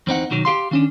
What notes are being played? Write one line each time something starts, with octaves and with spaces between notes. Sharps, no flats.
E2 C4 D#4 F#5
B1 D#3 F#3
G4 F5 C6
D#3 C#4 D4